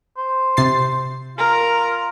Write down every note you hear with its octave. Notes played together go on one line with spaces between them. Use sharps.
C5
C3 A6 C7
F4 A#4